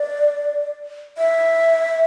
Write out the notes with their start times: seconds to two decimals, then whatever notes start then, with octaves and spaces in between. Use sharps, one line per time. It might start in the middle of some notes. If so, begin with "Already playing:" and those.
Already playing: D5
1.18 E5